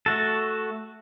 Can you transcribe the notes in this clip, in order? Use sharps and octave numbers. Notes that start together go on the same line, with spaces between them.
A3 F#4 A4